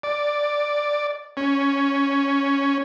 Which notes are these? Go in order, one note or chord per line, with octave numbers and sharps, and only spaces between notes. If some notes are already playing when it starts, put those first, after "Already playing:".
D5
C#4